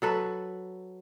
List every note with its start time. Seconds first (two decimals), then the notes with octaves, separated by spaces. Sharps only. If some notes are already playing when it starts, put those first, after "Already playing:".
0.02 F#3 A4 B4